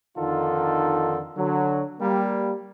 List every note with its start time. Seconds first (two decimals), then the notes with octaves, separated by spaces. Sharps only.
0.18 F2 D3 D#3 D#4 F4 A4
1.37 D3 F#3
2.00 G3 A#3